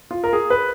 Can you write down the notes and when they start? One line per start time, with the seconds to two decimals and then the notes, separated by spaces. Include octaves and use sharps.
0.11 F4
0.24 A#4
0.33 G#4
0.50 B4